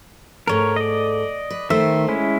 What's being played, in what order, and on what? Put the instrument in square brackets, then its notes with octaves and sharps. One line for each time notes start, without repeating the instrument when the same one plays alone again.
[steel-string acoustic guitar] G#2 A3 [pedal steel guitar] A#4 C#5
[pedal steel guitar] D5 D#5
[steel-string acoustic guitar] B4
[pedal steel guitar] D#3 E5 E6 [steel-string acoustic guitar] A3 C5
[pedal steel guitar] G#3 C#4 E4